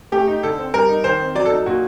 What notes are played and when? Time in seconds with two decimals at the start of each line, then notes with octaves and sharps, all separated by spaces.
0.12 A3 G4
0.28 D#4
0.43 D3 A4
0.58 C4
0.74 G3 A#4
0.89 D#4
1.04 D#3 C5
1.20 C4
1.35 F#3 D5
1.45 D#4 A4
1.66 A#2 F#4